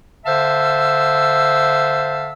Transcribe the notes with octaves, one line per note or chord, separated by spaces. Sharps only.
D3 C5 E5 F5 A5 E6